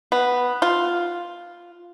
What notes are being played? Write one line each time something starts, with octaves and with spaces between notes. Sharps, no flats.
B3
F4